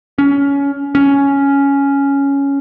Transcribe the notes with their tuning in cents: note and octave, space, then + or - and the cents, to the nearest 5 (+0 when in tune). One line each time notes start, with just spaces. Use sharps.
C#4 +20
C#4 +5